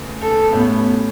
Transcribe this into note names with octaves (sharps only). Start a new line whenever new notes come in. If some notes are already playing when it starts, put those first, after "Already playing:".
Already playing: E2 C#3 A3
A4
A1 A2 A3 B3 C#4